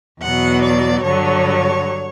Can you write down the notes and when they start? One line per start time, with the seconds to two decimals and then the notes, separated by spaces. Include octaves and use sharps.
0.22 E2 B2 F#3 F#5
0.63 D5
1.04 G2 D3 F#3 C#5